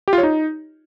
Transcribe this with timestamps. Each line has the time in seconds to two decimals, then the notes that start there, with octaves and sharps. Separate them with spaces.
0.08 G4
0.13 F4
0.18 C#5
0.23 D#4